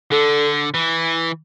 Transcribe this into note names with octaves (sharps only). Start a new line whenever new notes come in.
D3 A4
E3